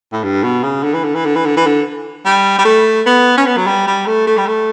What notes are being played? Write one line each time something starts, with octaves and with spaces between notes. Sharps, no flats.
A2
G2
B2
C#3
D3
E3
D3
E3
D3
E3
D3
E3
D3
G3
G3
A3
B3
C#4
B3
F#3
G3
G3
A3
A3
G3
A3